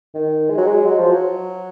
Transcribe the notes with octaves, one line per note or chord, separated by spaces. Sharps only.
D#3
G#3
F#3
G#3
F#3
F3
F#3